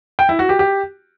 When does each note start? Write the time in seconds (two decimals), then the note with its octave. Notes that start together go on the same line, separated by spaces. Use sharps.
0.19 G5
0.29 E4
0.39 F#4
0.49 G4
0.59 G4